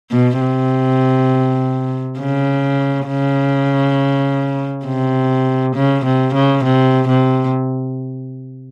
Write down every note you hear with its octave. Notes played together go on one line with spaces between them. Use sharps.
B2
C3
C#3
C#3
C3
C#3
C3
C#3
C3
C3